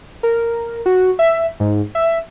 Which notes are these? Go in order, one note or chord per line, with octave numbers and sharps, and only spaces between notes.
A#4
F#4
E5
G#2
E5